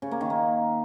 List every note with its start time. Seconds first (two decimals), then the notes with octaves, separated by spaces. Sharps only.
0.02 C#3
0.11 A#3
0.21 D#3
0.30 A#3